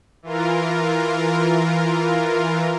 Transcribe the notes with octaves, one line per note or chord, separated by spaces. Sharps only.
E3 F4 A#4